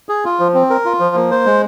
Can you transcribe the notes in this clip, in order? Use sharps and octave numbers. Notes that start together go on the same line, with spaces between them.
G#4
F4
F3
C4
A#4
F4
F3
A#3
C5
G#3